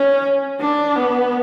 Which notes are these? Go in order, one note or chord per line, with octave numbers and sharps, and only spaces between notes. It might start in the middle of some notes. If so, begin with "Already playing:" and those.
Already playing: C#4
D4
B3